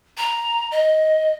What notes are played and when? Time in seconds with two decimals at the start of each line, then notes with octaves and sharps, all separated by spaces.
0.17 A#5
0.71 D#5